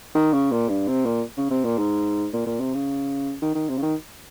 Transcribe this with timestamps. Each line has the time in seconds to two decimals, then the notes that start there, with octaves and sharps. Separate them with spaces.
0.15 D#3
0.33 C#3
0.51 A#2
0.69 G2
0.87 C3
1.06 A#2
1.37 C#3
1.51 C3
1.64 A#2
1.78 G#2
2.33 A#2
2.46 A#2
2.60 C3
2.74 C#3
3.42 D#3
3.55 D#3
3.69 C3
3.77 C#3
3.82 D#3